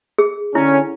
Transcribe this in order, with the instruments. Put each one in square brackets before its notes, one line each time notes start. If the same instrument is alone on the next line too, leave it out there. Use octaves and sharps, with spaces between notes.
[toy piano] G#4
[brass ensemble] D3 C#4 [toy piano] E4